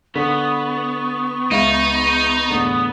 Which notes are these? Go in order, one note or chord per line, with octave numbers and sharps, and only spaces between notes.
D3 B3 C#6 B6
C#2 D#4 E5 F5
E2 A2 D3 B3